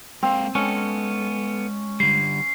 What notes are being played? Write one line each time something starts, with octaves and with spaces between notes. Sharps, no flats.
G#3 A#3 C4 F5
G#3 B3 C#4 A4
D3 G3 C7